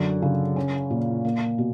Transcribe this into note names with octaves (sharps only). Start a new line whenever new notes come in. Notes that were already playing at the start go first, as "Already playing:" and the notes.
Already playing: F#2 D3
C#3
C#4
A#2
A#3
B2